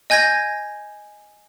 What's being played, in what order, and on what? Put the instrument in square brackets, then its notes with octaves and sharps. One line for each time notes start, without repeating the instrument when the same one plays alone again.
[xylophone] D#5 G#5 G6 G#6 A#6